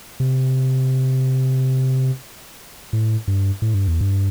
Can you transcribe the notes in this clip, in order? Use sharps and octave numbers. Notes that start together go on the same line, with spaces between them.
C3
A2
G2
A2
G2
E2
G2